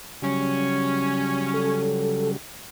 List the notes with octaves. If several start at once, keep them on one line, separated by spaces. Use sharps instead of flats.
C#3 F#3 G3 C#4
A4